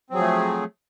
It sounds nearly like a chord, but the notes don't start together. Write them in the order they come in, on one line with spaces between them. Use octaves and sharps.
C4 F#3 G#4 F3 A3